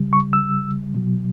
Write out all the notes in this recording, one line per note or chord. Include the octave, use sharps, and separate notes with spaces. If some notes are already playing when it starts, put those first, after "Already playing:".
Already playing: C#3 G3
C#6
E6
B2 F#3